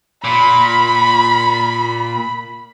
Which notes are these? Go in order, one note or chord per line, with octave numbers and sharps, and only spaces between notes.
A#2 B5